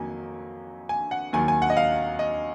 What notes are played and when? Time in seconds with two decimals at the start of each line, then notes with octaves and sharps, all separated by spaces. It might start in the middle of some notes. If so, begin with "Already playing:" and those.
Already playing: F2 D#3 F#3 A#3 G#5
0.89 G#5
1.11 F#5
1.33 D#2 D#3 F#3 G#5
1.48 G#5
1.62 F#5
1.70 D#5
1.77 F5
2.19 D#5